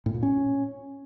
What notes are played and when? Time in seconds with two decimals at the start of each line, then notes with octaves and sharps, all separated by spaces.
0.06 A2
0.14 A#2
0.23 C#4